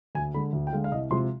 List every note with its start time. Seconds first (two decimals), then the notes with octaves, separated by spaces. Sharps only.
0.15 D2 G#5
0.34 D3 G#3 B5
0.53 D2
0.67 G5
0.72 D3 G#3 F5
0.84 F5
0.92 C2 D#5
1.11 C3 F3 G#3 C6